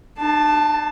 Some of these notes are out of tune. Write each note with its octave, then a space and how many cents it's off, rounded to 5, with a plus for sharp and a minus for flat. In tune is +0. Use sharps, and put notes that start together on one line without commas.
D4 +45 A5 +0